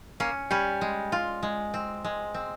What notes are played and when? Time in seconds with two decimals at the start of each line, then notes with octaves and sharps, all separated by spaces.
0.20 A#3 C#4
0.51 G3 C#4
0.81 G#3
1.12 F4
1.43 G#3
1.74 C4
2.04 G#3
2.34 C4